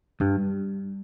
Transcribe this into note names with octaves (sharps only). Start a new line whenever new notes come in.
G2 G3